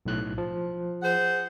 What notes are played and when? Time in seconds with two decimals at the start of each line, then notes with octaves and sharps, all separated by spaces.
0.06 B1 A2 F#6
0.38 F3
1.02 G#4 C5 F#5